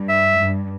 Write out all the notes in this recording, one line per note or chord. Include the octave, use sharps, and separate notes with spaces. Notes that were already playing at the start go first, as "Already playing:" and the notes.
Already playing: G2
E5
G2